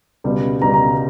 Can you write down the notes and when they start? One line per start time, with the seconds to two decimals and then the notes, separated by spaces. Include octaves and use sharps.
0.24 C#2 B2 G3
0.62 C#2 B2 G3 A#5
0.74 A#5